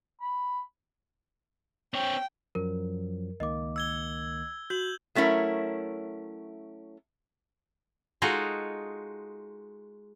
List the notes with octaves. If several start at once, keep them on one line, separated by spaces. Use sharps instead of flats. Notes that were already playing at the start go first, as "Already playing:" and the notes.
B5
C4 C#5 G5
F#2 F3 F#3 A#4
C#2 D#3 A#3 D#5 D6
E6 G#6 G7
F#4 G6 F#7
F#3 A3 C#4 E4 A#4
G#3 D#4 F4 F#4 A4